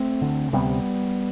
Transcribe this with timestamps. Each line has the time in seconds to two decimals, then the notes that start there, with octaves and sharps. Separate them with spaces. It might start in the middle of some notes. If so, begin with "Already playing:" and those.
Already playing: A3 C4
0.21 D2 D3
0.53 D2 C3 G3 B3